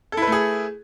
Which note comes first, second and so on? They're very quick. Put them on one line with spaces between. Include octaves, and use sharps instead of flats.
A4 E4 B4 A3 G#4